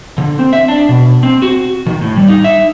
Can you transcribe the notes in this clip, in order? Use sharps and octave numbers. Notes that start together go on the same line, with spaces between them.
D3
C4
E5
D4
B2
C4
F#4
D#3
A2
G3
D#4
E5